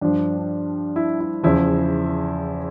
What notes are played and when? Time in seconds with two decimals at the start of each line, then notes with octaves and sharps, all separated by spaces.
0.01 G2 F3 D4
0.38 D4
0.96 E4
1.20 E4
1.43 E2 C#3 F3 E4